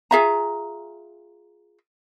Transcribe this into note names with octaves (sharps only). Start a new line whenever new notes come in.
F4 G#4 E5 A#5